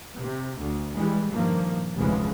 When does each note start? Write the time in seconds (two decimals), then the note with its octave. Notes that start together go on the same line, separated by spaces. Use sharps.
0.19 C3
0.59 D2
0.96 E3 G3 G#3
1.31 G2 A#2 D#3 F3 A#3
1.97 F1 D2 C#3 E3 F3 G#3